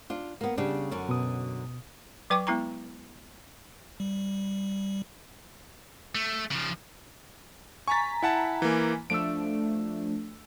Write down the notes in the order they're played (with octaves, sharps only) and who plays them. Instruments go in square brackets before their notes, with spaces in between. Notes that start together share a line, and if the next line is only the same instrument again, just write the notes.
[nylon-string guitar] D4 F4
A#3 B3
C#3 G3 D4
F#2 D3 C#4
[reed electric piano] B2 D#6
[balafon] F#3 B4 G5 C#6 D6
G#3 B3 E4 G5 A#5 C#6
[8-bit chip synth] G3
[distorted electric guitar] A3
C#3 F3
[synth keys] G#5 A#5 B6 [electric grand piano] C#6 A6
[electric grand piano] E4 F#5 A5
E3 A#3
[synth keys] F3 A3 D4 [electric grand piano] E6 D7